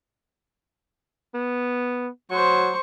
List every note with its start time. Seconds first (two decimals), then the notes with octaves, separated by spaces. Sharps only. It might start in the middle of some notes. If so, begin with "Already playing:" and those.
1.34 B3
2.31 F#3 C5 C#6